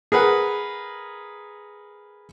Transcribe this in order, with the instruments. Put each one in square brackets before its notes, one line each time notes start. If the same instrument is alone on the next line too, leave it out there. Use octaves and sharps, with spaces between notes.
[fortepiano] G#4 A#4 B4 F#5